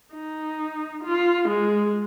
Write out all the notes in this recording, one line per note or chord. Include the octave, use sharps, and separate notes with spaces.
D#4
F4
G#3